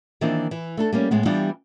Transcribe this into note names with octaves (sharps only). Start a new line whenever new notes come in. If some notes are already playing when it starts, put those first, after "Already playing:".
D#3 E3 A#3 C4 D4 F4
E3
A3 D4 A4
G3 A#3 C#4
A2 G#3 B3
E3 G3 B3 D4 F4 G4